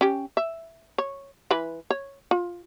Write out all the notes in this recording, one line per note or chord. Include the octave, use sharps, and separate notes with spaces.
C#4 G4
E5
C#5
E3 B4 B5
C#5
F4